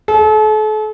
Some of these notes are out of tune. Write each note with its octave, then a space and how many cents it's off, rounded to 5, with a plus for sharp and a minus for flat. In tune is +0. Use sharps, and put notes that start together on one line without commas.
A4 -40